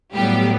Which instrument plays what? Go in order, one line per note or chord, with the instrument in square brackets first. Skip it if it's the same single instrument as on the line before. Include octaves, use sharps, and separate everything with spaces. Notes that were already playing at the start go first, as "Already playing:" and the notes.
[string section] A2 F#3 G3 B3 G4